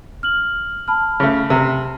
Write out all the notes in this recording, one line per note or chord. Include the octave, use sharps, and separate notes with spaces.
F6 F#7
A5 B5 F6
C#3 A3
C3